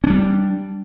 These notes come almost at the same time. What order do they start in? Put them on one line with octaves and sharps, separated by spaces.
C#4 D4 G3